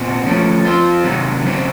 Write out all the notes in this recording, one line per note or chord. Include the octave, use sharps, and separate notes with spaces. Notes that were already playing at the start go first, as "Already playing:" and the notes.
Already playing: A#2 C4 F#4
F3 A3 C#4
F3 C4 F4
C3 D#3 F#3
C#3 F#3 C4